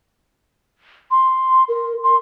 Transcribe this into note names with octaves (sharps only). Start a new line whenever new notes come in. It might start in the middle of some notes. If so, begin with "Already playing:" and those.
C6
A#4
C6